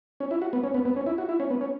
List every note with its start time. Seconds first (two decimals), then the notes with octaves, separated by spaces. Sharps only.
0.20 C#4
0.31 E4
0.42 F#4
0.53 B3
0.64 C#4
0.74 B3
0.85 B3
0.96 C#4
1.06 E4
1.18 F#4
1.29 E4
1.40 C#4
1.50 B3
1.61 C#4